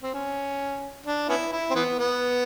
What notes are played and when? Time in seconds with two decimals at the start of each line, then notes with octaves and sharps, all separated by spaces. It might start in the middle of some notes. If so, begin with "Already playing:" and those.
0.03 C4
0.14 C#4
1.06 D4
1.29 B3 C#4 E4
1.52 E4
1.70 C4
1.75 E3 B3
1.99 B3